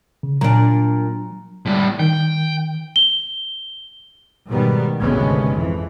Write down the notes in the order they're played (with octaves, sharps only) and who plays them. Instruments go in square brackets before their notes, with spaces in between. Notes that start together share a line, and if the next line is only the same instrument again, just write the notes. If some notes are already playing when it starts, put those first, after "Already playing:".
[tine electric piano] C#3
[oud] A#2 D4 [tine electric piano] F#3 A#5
[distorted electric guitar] A2 G3
[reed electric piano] D#3 [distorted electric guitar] G5
[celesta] G7
[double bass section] G#2 B2 D#3 G3 B3
G#1 D2 C3 G#3 B3 C#4
F2 E3